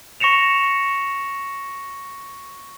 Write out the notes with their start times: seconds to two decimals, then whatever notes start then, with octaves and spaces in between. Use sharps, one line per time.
0.20 C#6 A#6 C#7 E7 F7